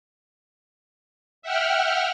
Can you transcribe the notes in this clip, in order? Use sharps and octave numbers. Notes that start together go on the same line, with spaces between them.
E5 F#5 G5 F6